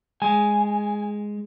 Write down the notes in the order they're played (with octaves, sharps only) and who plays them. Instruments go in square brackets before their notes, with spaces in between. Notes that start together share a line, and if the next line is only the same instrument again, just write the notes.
[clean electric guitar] G#3 [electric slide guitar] G#5